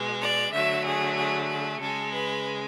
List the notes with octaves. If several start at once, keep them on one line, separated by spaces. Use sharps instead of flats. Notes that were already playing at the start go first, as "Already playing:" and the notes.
Already playing: B2 G#3
D5
D3 F#3 A3 E5
G#4
G#4
G#4
C#3 G#3 A4
B4